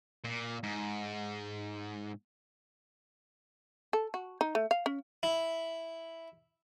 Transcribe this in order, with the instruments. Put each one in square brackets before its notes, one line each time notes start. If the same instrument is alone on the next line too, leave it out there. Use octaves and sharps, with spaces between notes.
[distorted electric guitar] A#2
G#2
[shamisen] A4
F#4
D#4
A3
F5
C#4
[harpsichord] E4